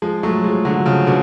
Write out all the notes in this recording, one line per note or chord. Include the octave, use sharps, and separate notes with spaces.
F3 G#3
F#3 A3
F3 G#3
D3 F#3
C#3 F3
B2 D3